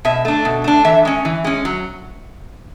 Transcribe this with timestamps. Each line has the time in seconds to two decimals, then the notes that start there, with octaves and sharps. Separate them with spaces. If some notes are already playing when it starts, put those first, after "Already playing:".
0.05 B2 E5
0.25 A3 D4
0.45 B2
0.64 A3 D4
0.85 E3 E5
1.05 G#3 C#4
1.25 E3
1.45 G#3 C#4
1.65 F#3